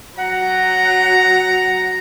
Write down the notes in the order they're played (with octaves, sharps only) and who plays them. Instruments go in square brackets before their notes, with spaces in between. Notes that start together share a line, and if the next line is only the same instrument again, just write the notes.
[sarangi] F#3 [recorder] F#5 [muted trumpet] A#5